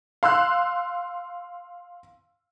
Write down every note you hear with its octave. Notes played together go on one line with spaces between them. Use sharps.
F5 C6 E6 F#6